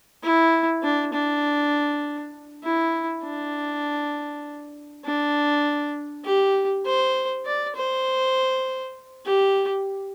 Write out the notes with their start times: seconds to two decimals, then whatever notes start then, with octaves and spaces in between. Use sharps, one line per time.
0.23 E4
0.83 D4
1.13 D4
2.64 E4
3.24 D4
5.05 D4
6.25 G4
6.86 C5
7.46 D5
7.76 C5
9.26 G4